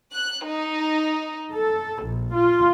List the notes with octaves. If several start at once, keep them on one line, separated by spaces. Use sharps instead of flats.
F#6
D#4
A4
A#1
F4